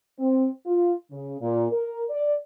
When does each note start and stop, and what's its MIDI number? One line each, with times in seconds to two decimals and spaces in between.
0.19 0.48 60
0.66 0.93 65
1.11 1.36 49
1.41 1.65 46
1.71 2.03 70
2.10 2.34 74